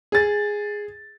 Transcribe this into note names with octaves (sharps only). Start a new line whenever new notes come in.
G#4 A6